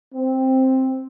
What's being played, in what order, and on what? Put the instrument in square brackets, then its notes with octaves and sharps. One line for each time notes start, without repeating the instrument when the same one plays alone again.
[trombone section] C4